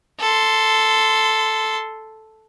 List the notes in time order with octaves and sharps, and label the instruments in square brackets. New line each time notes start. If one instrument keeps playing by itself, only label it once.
[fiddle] A4 C6